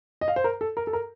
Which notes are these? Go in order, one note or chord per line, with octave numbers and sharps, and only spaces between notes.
D#5
F5
C5
A#4
A4
A#4
A4
A#4